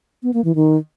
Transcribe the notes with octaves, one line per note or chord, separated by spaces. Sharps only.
B3
A#3
E3
D#3